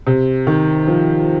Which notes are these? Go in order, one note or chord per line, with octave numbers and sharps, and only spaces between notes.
C3
D#3
F3